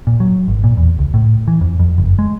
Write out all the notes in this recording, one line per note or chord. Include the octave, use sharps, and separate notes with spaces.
A#2
F#3
G#1
A#2
E2
C#2
A2
E3
F2
F2
F#1
G#3